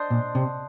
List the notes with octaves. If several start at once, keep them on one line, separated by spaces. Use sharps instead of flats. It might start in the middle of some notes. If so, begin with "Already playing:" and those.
Already playing: D4 C5 D#5
A#2
C3